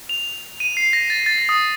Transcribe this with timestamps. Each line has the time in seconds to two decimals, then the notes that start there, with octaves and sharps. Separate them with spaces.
0.09 F7
0.60 D#7
0.77 C7
0.93 A#6
1.10 A6
1.26 A6
1.38 A#6
1.49 D#6